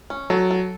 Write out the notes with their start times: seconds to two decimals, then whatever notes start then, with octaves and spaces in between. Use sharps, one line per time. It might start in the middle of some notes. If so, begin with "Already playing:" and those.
0.10 C#4
0.30 F#3 A4
0.51 A4